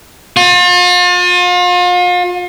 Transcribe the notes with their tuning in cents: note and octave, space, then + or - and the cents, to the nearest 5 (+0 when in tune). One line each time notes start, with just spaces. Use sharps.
F4 +40